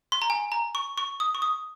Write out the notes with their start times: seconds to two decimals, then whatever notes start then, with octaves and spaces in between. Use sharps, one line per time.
0.12 C6
0.22 A#5
0.30 G#5
0.52 A#5
0.75 C#6
0.98 C#6
1.20 D#6
1.35 C#6
1.42 D#6